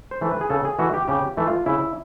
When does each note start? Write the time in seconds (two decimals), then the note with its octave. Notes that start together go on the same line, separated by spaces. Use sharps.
0.11 C5
0.21 E3 A3
0.31 B4
0.41 G#4
0.50 C#3 A4
0.65 G#4
0.79 E3 A3 F#4
0.94 G4
1.08 C#3 G4
1.37 E3 A3
1.47 F4
1.66 C#3 E4